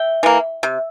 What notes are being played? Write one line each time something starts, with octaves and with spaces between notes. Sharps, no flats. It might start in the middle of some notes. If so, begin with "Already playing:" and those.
Already playing: E5 G5
E3 A#3
C3